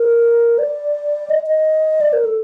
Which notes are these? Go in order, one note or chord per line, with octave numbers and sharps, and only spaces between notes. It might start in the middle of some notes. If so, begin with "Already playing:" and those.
Already playing: A#4
D5
D#5
D#5
D5
A#4
A4